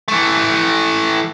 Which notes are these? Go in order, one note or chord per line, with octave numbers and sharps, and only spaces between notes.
E3 A3